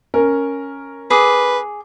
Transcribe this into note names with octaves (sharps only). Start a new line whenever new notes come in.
C#4 A#4
G#4 B4 D6